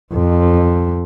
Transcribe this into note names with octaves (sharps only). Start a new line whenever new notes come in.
F2